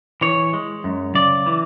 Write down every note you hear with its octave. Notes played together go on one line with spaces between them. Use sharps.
E3 C#5
G#3
F#2
C#3 D5
E3